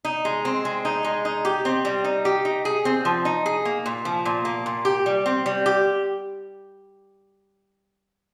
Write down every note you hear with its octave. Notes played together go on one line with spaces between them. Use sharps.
D#4
G#3
C4
G#3
D#4
G#3
D#4
G4
C4
G3
D#4
G4
D#4
G#4
C4
F3
D#4
G#4
A#3
A#2
F3
A#2
A#3
A#2
G4
G3
C4
G3
G4